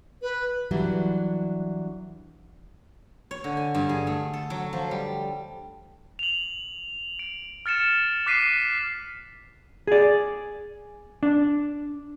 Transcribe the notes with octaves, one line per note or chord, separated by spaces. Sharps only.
B4
E3 F#3 G3 B3 D4 E4
C#5
D3
G#5
G2
G#4
A3
A4
F#3
F3
G3
F7 F#7
D7
F6 A6 C#7 E7
D6 F#6 B6 C7 D#7
G#4 D5
D4